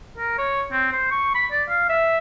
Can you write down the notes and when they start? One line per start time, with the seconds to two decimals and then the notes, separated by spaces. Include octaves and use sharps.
0.18 A#4
0.38 C#5
0.72 C4
0.92 C5
1.11 C#6
1.35 B5
1.51 D5
1.69 F5
1.89 E5